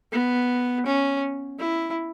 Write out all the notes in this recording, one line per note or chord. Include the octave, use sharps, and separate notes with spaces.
B3
C#4
E4